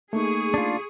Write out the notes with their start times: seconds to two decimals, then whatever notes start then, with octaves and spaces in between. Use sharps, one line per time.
0.13 A3 A#3 D#4 G#4 C#6 D#6
0.54 D4 F4